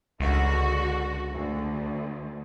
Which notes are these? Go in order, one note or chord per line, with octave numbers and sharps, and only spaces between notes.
C#2 D3 F#4
D2